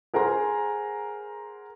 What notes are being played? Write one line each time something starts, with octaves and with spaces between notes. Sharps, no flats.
G#4 A#4 C5 F#5 A#5 C6